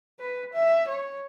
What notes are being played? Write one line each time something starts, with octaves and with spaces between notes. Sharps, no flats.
B4
E5
C#5